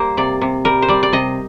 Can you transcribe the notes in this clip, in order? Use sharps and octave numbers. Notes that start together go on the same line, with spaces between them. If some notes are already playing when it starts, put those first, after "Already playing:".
Already playing: G3 A#3 A#4 C5
C3 D5
C3
G3 A#4
C5
G3 D5
D5
C3 D#5